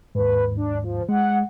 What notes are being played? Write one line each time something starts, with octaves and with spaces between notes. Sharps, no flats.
D#2 G#2 B4
D4
F3
G#3 F#5